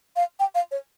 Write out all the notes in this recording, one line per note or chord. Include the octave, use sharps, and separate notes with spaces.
F5
G5
F5
C#5